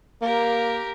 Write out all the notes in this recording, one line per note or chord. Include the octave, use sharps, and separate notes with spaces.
A#3 G4 A#4